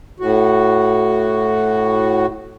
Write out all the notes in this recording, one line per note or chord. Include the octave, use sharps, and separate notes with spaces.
A2 F#4